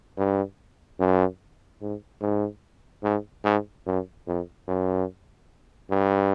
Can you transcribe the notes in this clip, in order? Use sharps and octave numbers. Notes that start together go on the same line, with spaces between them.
G2
F#2
G#2
G#2
G#2
G#2
F#2
F2
F#2
G2